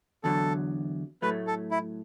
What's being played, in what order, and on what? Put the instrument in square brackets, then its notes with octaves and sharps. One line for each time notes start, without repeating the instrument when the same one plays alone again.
[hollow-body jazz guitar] E2 D3 F#3 [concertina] A4
[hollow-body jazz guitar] A2 F#3 A3 [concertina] B4
[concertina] A4
E4